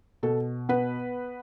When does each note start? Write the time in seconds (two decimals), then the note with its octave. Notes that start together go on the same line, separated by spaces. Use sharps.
0.23 B2 A4
0.69 B3 B4